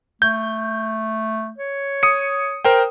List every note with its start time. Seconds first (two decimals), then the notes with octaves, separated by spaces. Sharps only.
0.22 A3 G6
1.58 C#5
2.03 D#6 C#7
2.65 A#4 C5 G5